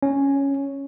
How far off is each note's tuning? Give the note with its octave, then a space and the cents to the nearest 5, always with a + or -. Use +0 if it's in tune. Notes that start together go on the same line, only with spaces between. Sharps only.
C#4 +0 C#5 +0